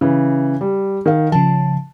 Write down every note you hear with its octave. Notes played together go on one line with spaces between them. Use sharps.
C#3 E3
G3
D#3 F5
C#3 F3 A5